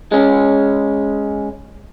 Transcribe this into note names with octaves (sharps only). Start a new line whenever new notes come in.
G#3 C#4